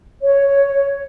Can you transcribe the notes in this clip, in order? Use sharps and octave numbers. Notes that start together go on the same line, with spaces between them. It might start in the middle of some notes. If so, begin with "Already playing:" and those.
C#5